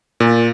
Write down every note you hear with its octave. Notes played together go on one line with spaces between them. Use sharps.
A#2